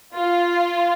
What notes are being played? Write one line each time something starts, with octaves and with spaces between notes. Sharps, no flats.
F4